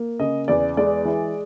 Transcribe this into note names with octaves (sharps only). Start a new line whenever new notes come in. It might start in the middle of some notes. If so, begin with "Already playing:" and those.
Already playing: A#3
C#3 D#5
E2 D5
G#3 D5
E3